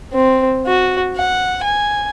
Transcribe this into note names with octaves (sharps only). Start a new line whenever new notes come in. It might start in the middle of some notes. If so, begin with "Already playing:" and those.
C4
F#4
F#5
G#5